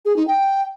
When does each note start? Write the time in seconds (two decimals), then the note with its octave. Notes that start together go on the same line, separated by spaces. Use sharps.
0.05 G#4
0.16 D#4
0.27 G5